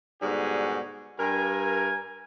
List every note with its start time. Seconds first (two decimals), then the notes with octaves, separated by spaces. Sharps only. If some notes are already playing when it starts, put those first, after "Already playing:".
0.22 G#2 B2 D3 G3 F#4 G#4
1.20 G2 A#4 G#5